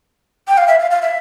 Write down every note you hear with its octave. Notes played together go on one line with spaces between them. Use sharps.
G5
F5
E5
F5
F5
E5